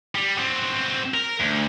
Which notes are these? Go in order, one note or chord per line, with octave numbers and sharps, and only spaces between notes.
G3
F#3 C4
A#4
D2